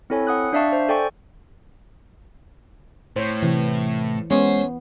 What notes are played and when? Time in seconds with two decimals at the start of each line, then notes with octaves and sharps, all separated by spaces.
0.10 C4 E4 A4 C#5 G#5
0.27 F#5 D#6 F#6
0.53 D4 D5 E5 F5 A5 C#6
0.72 C5
0.89 A4 D5 G5 G#5 C#6
3.16 A2 C5 C#5
3.43 C3 E3
4.31 G#3 B3 C#4 C5